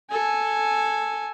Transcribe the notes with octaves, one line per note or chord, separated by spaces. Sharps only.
A4 G#5